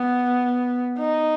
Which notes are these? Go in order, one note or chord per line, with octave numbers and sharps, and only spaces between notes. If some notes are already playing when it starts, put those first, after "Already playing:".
Already playing: B3
D#4